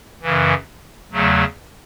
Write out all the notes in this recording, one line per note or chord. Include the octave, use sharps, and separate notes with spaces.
F#2 C#3 E3
E2 C#3 F#3 A3